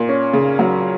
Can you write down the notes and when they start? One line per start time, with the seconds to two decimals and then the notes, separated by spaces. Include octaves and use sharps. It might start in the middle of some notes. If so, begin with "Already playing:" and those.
Already playing: A#2
0.09 C#4
0.33 C#3
0.59 F#3